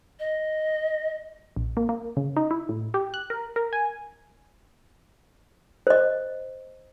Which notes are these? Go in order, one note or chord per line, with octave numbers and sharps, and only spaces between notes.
D#5
A#1
A#3
A#3
C#3
D#4
E4
A2
G4
F#6
A#4
A#4
G#5
C5 D#5